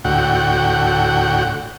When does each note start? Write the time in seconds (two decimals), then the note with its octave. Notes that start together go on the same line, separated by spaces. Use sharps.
0.05 D2 A2 F#4 F#5 G5